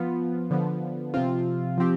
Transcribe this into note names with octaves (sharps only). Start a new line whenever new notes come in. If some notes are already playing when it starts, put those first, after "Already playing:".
Already playing: F3 B3 F4
D3 F3 B3
C3 F3 C4 F4
F3 C4 G4